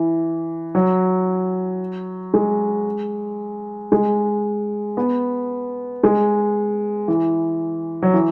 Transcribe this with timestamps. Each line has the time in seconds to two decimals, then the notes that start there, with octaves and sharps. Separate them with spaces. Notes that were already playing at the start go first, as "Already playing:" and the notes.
Already playing: E3
0.75 F#3
2.34 G#3
3.92 G#3
4.97 B3
6.03 G#3
7.08 E3
8.02 F#3
8.14 E3